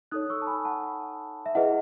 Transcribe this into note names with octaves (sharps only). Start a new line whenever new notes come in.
D#4 A4 C#5 D#6 F#6
C#6 E6
A5
G#5 B5
F#5 A5
E5
E4 G#4 B4 D#5 F#5